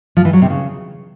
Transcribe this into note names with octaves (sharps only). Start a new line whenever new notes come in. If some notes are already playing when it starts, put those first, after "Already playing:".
F3
E3
F#3
C3
C#3